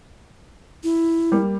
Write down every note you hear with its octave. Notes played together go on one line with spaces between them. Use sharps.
E4
G3 A#3